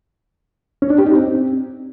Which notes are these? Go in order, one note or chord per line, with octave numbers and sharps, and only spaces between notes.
C#4
D4
G4
D#4
C4